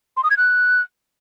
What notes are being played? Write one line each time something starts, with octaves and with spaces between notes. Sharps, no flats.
C6
D#6
G#6
F#6